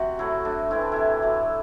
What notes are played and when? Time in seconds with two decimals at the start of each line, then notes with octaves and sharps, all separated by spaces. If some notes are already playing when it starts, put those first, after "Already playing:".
Already playing: C3 F#4
0.19 F#3 A3 E4
0.45 A2 D4
0.71 E3 A3 C4 E4
0.81 D4
0.92 C3 E4
1.22 F#3 A3